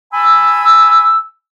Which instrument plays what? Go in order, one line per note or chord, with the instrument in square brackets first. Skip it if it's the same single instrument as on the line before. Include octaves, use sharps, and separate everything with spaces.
[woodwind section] G#5 A5 B5 E6